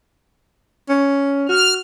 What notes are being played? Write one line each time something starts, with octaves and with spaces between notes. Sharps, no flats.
C#4
F#4 F6